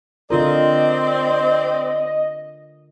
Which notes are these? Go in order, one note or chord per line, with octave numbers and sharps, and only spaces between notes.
D3 C4 F4 A#4 D5 D#5